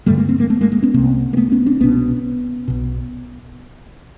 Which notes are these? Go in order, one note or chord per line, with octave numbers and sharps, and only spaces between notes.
A1 G2 D3 G3 A3
G#3 A#3
A#3 C4
G#3 A#3
A3 B3
G#3 A#3
G#3 A#3
B3 C#4
C2 C3 A#3 C4
A#3
A3 B3
B3 C#4
C4 D4
C2 B2 B3 C#4
B1 B2